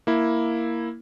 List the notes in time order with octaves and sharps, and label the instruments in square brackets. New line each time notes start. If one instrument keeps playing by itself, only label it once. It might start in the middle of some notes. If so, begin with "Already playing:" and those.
[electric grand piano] A#3 E4